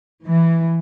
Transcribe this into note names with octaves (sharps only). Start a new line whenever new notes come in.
E3